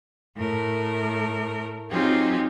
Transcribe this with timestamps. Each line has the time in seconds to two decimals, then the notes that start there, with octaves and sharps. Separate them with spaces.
0.37 A2 A3 A#4
1.91 F#3 C4 D#4 F4 G4 G#4